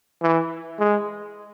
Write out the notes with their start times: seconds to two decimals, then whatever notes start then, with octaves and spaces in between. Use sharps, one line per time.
0.22 E3
0.79 G#3